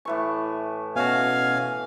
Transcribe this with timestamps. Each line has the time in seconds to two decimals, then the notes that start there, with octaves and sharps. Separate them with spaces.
0.05 A2 E3 C#6
0.96 B2 C#4 F#4 F5 G#5